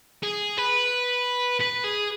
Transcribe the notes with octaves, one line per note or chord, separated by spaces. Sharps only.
G#4
B4
B4
G#4